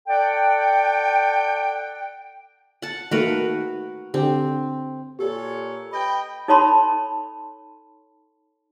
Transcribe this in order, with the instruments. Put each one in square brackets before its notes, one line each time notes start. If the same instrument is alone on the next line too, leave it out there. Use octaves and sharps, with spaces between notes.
[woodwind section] A4 D5 F#5 G5
[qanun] F#5 A5
[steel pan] D#3 A3 A#3 [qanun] F#4 A#4 B4
[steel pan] D3 G4 [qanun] C4
[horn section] A#2 A4 C#5 [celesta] G4
[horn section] B4 D#5 G5 [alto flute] B5
[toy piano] D#4 A4 C#5 A5 B5 C6